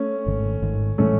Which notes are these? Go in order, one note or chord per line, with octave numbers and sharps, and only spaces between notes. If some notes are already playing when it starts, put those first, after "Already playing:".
Already playing: A3 C#4
G#1 G#2 D#3
G#1 G#2 D#3
A2 E3 G#3 A3 C#4